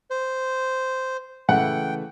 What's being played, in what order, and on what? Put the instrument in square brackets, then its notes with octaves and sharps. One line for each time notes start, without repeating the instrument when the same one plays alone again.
[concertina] C5
[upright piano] C#3 E3 A3 [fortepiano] F#5 [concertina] G5